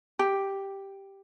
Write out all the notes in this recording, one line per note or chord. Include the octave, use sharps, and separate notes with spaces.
G4